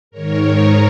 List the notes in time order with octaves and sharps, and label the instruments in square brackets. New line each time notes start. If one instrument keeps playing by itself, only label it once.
[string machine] G#2 D#3 A#4 C#5